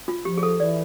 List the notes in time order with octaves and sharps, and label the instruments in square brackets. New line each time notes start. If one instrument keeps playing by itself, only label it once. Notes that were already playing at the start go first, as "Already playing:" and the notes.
[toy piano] F4
[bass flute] F3 [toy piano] G4
[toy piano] G#4
A4
[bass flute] E3 [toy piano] D5